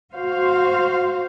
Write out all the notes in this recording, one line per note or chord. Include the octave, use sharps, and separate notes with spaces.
F#4 C5 F5